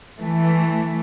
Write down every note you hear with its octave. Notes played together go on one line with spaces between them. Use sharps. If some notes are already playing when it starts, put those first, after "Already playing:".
E3 A3